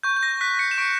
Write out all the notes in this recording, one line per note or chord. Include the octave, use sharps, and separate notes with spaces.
C#6 G6
G6
A#6
F#6 B6
A#6 C#7
E7
C#6 B6 D7